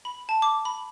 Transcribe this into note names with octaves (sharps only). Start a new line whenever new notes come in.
B5
A5
D6
B5